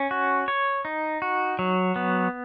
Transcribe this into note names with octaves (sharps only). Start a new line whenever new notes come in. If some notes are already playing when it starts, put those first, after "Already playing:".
Already playing: C#4
F#4
C#5
D#4
F#4
F#3
B3